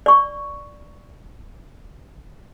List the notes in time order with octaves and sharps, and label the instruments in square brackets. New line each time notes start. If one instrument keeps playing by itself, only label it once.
[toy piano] D5 C#6